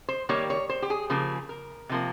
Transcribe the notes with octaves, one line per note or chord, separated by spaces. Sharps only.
C5
D#3 G3 A#3 C#5
C#5
C5
G4
G#4
C#3 F3 A#3 G#4
A#4
C3 F3 A#3